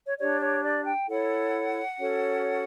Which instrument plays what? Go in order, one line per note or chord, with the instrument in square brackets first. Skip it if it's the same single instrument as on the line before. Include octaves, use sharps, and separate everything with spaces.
[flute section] C#5
D4 G4 C#5 D5
C#5
D5
G5
E4 A4 C#5 F#5
C#4 F#4 A4 C#5